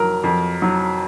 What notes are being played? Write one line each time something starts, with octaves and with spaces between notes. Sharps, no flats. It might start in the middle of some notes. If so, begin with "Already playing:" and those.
Already playing: F2 F#3 A#4
F2
F#3